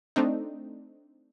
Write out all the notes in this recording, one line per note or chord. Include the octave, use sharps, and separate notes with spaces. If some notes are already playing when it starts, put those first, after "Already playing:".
A3 C4 D4 D#4